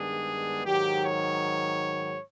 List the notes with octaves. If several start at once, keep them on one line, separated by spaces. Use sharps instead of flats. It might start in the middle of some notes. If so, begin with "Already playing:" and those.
Already playing: G2 D#3 G#3 B3 D4 G#4
G#2 D#3 F#3 G4
C#5